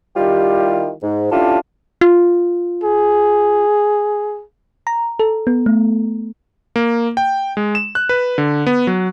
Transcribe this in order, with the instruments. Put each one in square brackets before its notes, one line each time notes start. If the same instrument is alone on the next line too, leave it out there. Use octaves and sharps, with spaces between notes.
[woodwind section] D#3 G3 E4 F4 G4
G#2
C#4 D4 E4 F4 G4 A4
[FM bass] F4
[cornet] G#4
[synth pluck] A#5
A4
B3
A3
[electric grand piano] A#3
G5
G#3
E7
F#6
B4
D3
B3
F#3